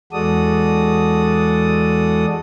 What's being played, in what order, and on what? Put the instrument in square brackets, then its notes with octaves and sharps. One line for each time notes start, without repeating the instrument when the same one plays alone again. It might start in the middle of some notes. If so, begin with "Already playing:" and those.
[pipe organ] E2 G#3 F#4 A4 D5 D#6